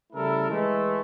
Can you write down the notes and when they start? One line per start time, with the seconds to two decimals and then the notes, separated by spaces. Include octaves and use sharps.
0.13 C#3 G3 A3 E4 A4 A#4
0.50 E3 G#3 A3